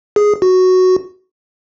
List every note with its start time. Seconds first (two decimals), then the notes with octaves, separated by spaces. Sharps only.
0.16 G#4
0.42 F#4